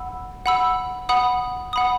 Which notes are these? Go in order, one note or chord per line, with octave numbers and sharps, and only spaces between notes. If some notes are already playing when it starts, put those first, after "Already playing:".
Already playing: F#5 B5 E6
F#5 B5 E6
F#5 B5 D#6
F#5 B5 D#6